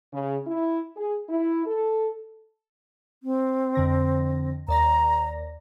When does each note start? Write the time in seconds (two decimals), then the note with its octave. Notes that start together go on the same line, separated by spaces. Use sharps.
0.13 C#3
0.46 E4
0.96 G#4
1.29 E4
1.65 A4
3.23 C4
3.75 F2 D3 A#6
4.68 D#2 D5 A#5 A#6